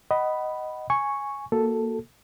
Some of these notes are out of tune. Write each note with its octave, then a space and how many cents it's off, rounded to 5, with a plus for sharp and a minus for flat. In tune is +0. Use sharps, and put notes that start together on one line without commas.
D#5 +0 F#5 +25 B5 +0
G#5 +0 C#6 +0
A#3 +0 F#4 +0 A4 +0